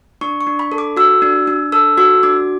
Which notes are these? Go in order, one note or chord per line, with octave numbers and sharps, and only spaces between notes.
D4 C#6
C#6
D4
B5
A4
D6
F#4 E6
D4
D4
A4 E6
F#4 E6
D4 D6